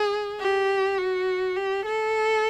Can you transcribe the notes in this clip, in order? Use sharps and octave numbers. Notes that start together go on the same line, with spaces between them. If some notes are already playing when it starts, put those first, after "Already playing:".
Already playing: G#4
G4
F#4
G4
A4